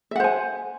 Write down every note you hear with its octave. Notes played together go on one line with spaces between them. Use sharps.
C5 E5 F#5 G#5